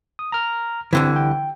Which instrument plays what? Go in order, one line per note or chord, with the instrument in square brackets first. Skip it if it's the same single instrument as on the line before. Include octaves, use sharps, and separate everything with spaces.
[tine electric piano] D#6
A#5 F6
[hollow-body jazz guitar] C2 D3 E3 [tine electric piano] C4
[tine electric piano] G5